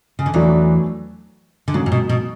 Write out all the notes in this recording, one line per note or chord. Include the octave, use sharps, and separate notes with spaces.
C#3
D3
E2 E3 F#3 A3 D4
D3
G#2 C#3 F#3 C#4
A2
B2
B2